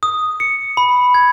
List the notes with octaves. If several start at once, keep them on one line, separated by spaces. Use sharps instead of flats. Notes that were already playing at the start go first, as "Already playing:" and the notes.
D#6
C#7
B5
G#6